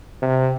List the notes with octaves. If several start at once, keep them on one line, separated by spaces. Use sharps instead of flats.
C3